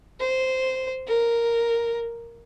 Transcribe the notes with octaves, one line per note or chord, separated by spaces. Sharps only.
C5
A#4